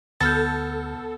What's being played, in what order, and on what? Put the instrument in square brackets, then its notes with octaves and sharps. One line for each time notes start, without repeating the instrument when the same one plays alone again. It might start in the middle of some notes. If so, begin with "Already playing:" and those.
[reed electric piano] D2 A6 [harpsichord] B3 [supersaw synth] A4 [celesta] A5 F6 G6